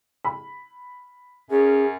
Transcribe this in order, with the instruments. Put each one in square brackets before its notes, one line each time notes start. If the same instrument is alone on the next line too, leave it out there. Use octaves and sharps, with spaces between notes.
[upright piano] B5
[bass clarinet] F#2 [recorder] C#4 [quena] G#4